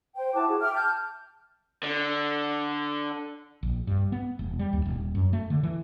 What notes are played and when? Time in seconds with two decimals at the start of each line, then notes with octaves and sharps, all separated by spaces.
0.16 C5 G5
0.34 E4 F#4 A5 D6
0.48 F#4 G#4
0.60 E5 G5 D6 F6
0.74 A5 F6 G6
1.83 D3
3.63 A#1
3.87 G2
4.12 B3
4.39 E1
4.59 G3
4.73 D#2
4.85 D#1
5.15 F#2
5.33 A3
5.50 D3
5.63 E3